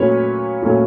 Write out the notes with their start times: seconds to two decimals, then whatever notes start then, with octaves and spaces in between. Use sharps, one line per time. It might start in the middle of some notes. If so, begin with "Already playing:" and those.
Already playing: A#2 F#3 A3 C#4 B4 C#5
0.62 A#2 F#3 A3 C#4